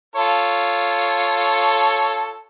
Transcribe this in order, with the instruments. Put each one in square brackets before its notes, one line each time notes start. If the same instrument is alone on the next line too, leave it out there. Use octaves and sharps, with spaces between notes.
[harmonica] F4 A4 C#5